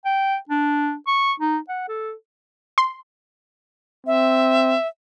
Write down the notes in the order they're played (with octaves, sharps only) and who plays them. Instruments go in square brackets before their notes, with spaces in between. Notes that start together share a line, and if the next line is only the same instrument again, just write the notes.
[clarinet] G5
D4
C#6
D#4
F#5
A4
[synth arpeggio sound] C6
[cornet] C4 [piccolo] E5